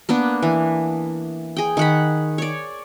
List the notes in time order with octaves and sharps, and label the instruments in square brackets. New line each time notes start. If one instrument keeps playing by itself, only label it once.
[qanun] A#3 B3 D4
E3
G#4 G5
D#3 F#5 B5
C#5 D5